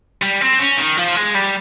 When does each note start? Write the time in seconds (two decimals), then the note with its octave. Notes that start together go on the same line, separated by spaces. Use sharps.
0.22 G3
0.41 C4
0.59 C#4
0.78 D#3
0.97 F3
1.16 G#3
1.35 G3